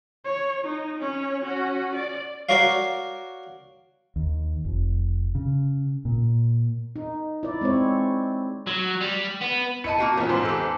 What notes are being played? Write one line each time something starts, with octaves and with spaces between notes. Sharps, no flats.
C#5
D#4
C#4 C#5
C#4 F#4
D5
F#4 A#4 C#5 D5 F5
D#2
F1
C#3
A#2
D#4
E4 D5
G#3 C4 E4 C#5
F#3
G3
B3
E4 D#5 A5 C#7 D#7
A#3 F#4 G5
E2 A#2 B3 C#4 D#4
E2 G#2 F4 C5
G4 A4